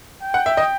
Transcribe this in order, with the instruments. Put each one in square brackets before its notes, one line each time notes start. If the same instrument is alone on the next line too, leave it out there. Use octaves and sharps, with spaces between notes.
[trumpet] G5
[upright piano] F#5
E5
D#5